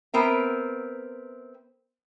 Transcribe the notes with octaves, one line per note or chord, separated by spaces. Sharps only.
B3 C4 A#4 E5